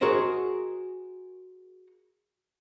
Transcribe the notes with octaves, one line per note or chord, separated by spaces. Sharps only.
F#4 G#4 A#4 C5 D#5